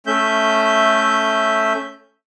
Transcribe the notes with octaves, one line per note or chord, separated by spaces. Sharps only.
A3 C#4 E5 G6